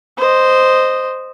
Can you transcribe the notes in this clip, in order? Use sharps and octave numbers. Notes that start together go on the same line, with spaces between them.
C5 D#5